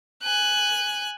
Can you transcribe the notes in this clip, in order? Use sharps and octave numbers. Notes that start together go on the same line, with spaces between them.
G#5 F#6